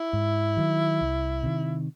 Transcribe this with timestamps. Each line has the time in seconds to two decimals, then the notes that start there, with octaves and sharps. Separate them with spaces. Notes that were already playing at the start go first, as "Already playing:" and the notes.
Already playing: E4
0.13 G#2
0.57 D#3 F#3
1.01 C2
1.43 C3 D#3